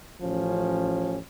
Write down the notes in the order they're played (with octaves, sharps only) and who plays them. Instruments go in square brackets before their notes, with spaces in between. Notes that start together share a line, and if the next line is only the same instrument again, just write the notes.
[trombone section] A1 F3 C#4